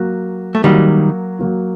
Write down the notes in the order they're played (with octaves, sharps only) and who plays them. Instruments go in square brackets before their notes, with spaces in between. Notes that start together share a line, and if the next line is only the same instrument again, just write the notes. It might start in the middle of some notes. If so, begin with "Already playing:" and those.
Already playing: [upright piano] F#3 A#3 F#4
[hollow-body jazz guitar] A3
[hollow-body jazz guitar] D#3 G3 [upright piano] F#3 A#3 F#4
[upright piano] F#3 A#3 F#4